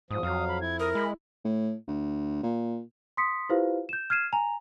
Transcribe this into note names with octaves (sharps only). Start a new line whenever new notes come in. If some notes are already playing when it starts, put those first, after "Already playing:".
E2 G#2 F3 D#6
F2 F#3 F5
B5
E4 G#6
A#4 D#6
G#3 B5
A2
D2
A#2
C6 D#6 B6 C#7
E4 F4 G4 B4 C5 F5
G6 E7
F6 G#6 C7 D#7 E7
G#5 A#5 F7